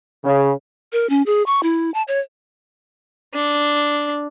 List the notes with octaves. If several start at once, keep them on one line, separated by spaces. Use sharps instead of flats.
C#3
A#4
C#4
G#4
C#6
E4
A5
C#5
D4